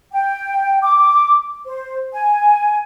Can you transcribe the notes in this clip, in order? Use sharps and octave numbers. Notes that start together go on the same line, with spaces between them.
G5
D6
C5
G#5